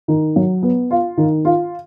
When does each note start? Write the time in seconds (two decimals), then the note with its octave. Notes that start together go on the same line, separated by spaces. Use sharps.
0.08 D#3
0.36 F#3
0.63 B3
0.91 F4
1.18 D#3
1.45 F4